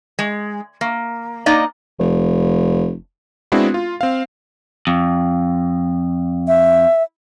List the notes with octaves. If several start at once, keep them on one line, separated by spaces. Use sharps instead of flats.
G#3
A#3
A#3 D#4 D5 D#5
F1
G#3 B3 C4 D4 E4 F#4
F4
C4 F5
F2
E5